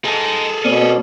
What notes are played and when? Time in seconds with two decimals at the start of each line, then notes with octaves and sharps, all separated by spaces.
0.05 G#3 D#4 G#4 A4
0.64 B2 A#3 C4 C#4 D5